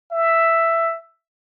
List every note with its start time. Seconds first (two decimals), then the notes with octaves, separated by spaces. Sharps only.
0.12 E5